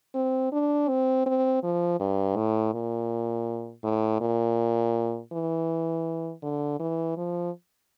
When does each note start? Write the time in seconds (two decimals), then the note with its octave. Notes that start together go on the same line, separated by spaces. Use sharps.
0.14 C4
0.52 D4
0.88 C4
1.26 C4
1.63 F3
2.00 G2
2.36 A2
2.74 A#2
3.84 A2
4.21 A#2
5.33 E3
6.42 D3
6.79 E3
7.17 F3